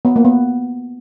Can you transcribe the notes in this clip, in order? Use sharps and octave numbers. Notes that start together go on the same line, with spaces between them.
B3
A#3
B3